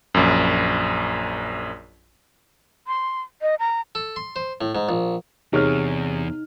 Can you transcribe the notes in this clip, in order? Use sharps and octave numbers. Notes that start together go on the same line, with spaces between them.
A#1 F#2
C6
D#5
A#5
A4
C6
C5
A2
G#2
A#1
E2 C3 D#4 G#4 C#5 F6